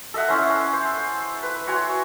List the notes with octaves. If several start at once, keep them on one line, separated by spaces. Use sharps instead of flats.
A4 D#5 E5 F#5
C#4 E4 C5 C6
C5
B4
F#4 C#5 G#5 C6